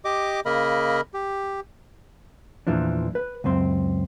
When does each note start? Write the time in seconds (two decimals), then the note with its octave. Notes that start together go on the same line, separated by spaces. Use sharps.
0.05 G4 D#5 D6
0.45 C#3 A#3 A#4 D#5 B5
1.14 G4
2.67 E2 A#2 E3 F3 D4
3.15 B4
3.44 C#2 F#2 C4 C6